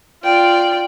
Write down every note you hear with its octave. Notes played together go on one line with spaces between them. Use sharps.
F4 D5 G5